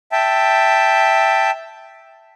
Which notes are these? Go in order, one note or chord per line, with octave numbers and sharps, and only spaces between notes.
E5 G5 A5